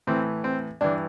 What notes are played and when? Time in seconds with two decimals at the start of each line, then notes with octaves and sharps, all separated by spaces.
0.07 A2 E3 C4
0.44 C4
0.81 G2 E3 D4